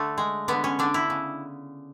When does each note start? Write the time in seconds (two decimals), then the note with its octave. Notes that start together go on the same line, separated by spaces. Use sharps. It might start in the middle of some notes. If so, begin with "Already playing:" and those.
Already playing: D3 A3
0.18 G#3
0.48 D3 B3
0.64 C#4
0.79 D3 D4
0.94 E4
1.10 C#3